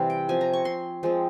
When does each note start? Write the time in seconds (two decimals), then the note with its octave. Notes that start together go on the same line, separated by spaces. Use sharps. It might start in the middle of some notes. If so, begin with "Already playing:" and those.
Already playing: C3 E3 G3 C4 F5
0.10 G5
0.29 F3 C4 G#5
0.41 A#5
0.53 C#6
0.65 C6
1.03 F3 G#3 C4